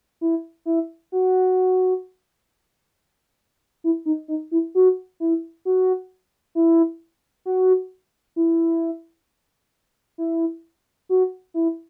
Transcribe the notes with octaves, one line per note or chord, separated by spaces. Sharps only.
E4
E4
F#4
E4
D#4
D#4
E4
F#4
E4
F#4
E4
F#4
E4
E4
F#4
E4